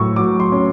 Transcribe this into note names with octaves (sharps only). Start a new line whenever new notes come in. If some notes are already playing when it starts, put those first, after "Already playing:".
Already playing: A2 F#3 C#6 E6
F#3 D6
C6
C#4